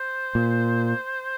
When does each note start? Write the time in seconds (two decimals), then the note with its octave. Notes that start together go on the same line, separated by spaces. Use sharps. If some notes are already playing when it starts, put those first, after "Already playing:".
Already playing: C5
0.35 A#2